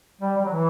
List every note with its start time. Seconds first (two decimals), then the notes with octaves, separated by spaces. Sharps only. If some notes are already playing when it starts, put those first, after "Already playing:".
0.21 G3
0.37 G3
0.45 F#3
0.52 E3